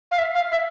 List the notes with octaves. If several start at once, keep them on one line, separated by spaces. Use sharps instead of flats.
F5
E5
F5
E5